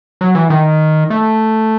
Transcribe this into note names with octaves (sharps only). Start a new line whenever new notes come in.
F#3
E3
D#3
A3